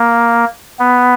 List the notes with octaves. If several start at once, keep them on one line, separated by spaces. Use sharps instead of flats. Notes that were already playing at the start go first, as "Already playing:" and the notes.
Already playing: A#3
B3